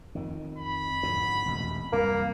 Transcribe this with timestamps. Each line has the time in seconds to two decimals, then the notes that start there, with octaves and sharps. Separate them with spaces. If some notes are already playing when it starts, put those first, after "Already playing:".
0.15 F2 D#3
0.58 B5
1.03 F2 G#2 D3
1.46 E1 A1 F2
1.93 C2 F#2 A#3